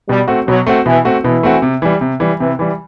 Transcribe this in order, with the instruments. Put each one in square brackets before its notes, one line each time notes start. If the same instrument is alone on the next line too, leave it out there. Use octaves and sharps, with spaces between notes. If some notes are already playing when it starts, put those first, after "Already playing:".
[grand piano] B2 [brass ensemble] G3
[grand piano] A3 C4 F#4
[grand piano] B2 [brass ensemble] F#3
[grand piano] A3 C4 F#4
[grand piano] B2 [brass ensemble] E3
[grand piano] A3 C4 F#4
[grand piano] B2 [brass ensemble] E3
[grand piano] A3 C4 F#4
C3
E3 G3
C3
E3 G3
[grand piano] C3 [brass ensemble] E3
[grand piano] E3 G3